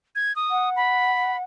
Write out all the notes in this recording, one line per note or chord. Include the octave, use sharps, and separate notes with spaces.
G#6
D#6
F#5
B5